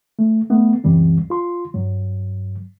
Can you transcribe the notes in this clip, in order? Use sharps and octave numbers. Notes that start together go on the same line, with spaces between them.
A3
A3 B3
C#2 F#2 E3 G3 C4
F4 C6
G2 F#3